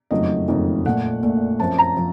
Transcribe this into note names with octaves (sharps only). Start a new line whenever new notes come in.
F#1 F2 D#3 F#3 A3 D#5
F#1 F2 D#3 F#3 A3
A#1 A#2 A3 F#5
A#1 A#2 A3
F#2 F3 C4 A5
A#5
F3 C4